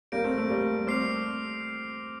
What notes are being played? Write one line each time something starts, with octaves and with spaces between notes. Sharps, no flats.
G3 A#3 G6 A#6 D7
A3 C4
A3 C4
G3 A#3
A3 C4 D6 F6 C7 F7